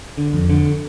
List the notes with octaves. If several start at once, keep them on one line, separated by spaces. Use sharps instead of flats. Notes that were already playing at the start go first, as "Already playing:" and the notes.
D3
F2
D3